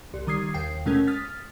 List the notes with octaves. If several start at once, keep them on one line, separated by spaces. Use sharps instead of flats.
C2
D#3 G3 D#6 G#6 C7
D#2 G5 C7
B2 G#3 A3 C#4 A#4 G#6
D#6 F6 A6 B6